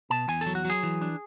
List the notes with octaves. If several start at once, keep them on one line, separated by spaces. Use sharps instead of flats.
B2 A5
E2 G#5
A4
F#3
F#4
F#3 G#4
E3
D4